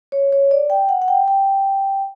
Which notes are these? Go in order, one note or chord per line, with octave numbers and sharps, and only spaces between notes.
C#5
C#5
D5
G5
F#5
F#5
G5
G5